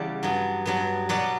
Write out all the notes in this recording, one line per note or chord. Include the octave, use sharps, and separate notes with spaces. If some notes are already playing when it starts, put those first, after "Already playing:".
Already playing: E2 C#3 G3 D5 F#5
G2 F#3 B3
G2 F#3 B3
B2 F#3 B3 D5 F#5